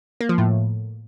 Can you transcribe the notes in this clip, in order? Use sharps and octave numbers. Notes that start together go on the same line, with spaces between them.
A#3
F3
A2